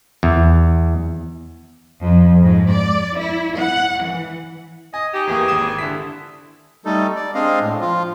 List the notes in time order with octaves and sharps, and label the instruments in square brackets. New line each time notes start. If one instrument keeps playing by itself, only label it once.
[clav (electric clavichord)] E2
[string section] F2
G#2
D5
E4
F#5
E3
[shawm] D#5 [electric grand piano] G#5
[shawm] D#4 [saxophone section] G4
[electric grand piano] E2 E3 A#3 [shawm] G#4
[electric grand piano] G#1 D#6 E7
[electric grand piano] D3 B6 [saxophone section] E4
[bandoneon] G3 A3 D#4 A4
D5
G#3 C4 D4 D#5 F5
A2
F3 F4